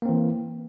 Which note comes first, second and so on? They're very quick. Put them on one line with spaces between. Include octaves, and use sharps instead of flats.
A#3 C4 E3